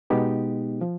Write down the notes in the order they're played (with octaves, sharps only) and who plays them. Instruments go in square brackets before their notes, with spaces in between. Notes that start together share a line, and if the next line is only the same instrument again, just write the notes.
[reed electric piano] B2 G#3 B3 D#4 G4
F3